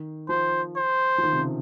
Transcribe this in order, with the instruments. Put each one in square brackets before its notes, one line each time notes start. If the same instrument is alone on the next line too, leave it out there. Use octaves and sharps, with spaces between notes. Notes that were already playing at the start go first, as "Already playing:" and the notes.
Already playing: [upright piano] D#3
[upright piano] F3 [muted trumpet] C5
[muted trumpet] C5
[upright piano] F3
D#3
C3
C#3